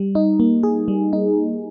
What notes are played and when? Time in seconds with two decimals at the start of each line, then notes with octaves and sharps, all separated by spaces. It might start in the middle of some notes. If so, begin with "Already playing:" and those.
Already playing: G3
0.15 D#4
0.40 A#3
0.63 G#4
0.88 G3
1.13 D#4